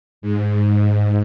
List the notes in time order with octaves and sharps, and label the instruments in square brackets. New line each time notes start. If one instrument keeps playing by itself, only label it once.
[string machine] G#2